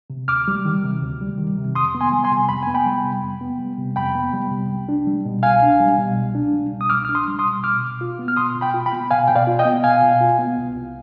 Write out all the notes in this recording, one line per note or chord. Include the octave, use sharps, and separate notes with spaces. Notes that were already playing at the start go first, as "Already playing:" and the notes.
C3
D2 D6 F6
G3
D#3
C3
D2
G3
D#3
C3
F2 C6 D#6
B3
G#5 C6
G3
G#5 C6
C3
F2 B5
B3 G#5
G5 B5
G3
C3
F2
B3
G3
C3
F2 G5 B5
B3
G3
C3
C2
D4
G3
B2
C2 F5 G#5
D4
G3
B2
C2
D4
G3
B2
D#6
C2 D6 F6
D4 F6
C6 D#6
G3
C6 D#6
B2
B2 D6 F6
B2
F4
B3
F6
B2 C6 D#6
B2
G5 B5
F4
G5 B5
B3
B2 F5 G#5
B2 G5
D5 F5
F4
D#5 G5
B3
B2 F5 G#5
B2
F4
B3
C2
C2